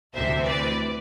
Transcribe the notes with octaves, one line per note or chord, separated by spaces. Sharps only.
D2 C3 E3 C5 E5
B4 D5